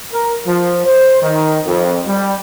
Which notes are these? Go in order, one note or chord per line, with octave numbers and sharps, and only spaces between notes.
A#4
F3
C5
D#3
F2
G3